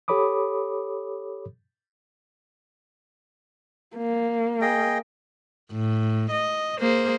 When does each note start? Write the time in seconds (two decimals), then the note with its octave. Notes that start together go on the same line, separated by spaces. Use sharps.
0.08 G4 A4 C#5 B5 D6 D#6
3.97 A#3
4.61 G#4 D#5 G5
5.72 A2
6.31 D#5
6.80 A#3 G#4 C5